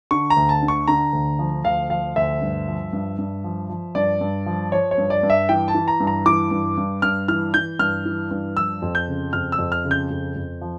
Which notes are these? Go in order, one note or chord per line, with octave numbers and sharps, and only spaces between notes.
D3 C#6
A#5
D2
A5
D3
C#6
D3 A#5
D2
F3
D2 F5
F3 F5
D2 E5
G2
F3
G2
G2
F3
F3
G2 D5
G2
F3
F3 C#5
C#5
G2
D5
G2
E5
E3 G5
A5
E3
A#5
G2
A#5
E3 D6
G2
G2
G2 F6
E3 F6
E3 G6
G2 F6
E3
G2
F3 E6
F2
G6
C#3
F2 F6
E6
F2
F6
C#3
G6
F2
F2
F3